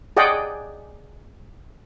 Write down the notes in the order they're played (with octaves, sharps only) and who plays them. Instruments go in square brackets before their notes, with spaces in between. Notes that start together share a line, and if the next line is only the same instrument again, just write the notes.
[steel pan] G#4 D5 D#5 F#5 G5